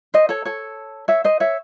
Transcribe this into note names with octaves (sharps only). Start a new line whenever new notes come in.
C5 D#5
A4 C#5
A4 C#5
C#5 E5
C5 D#5
C#5 E5